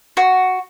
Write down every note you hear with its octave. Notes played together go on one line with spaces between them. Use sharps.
F#4